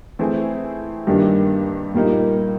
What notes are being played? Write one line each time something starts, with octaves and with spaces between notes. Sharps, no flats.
E3 A3 C4 E4 G#4
G2 D#3 G3 A#3 D4
A#2 G3 A#3 D#4